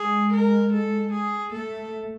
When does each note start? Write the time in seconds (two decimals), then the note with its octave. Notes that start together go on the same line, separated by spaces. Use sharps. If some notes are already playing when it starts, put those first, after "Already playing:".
Already playing: G#3 G#4
0.33 A#4
0.73 A4
1.13 G#4
1.53 A3 A4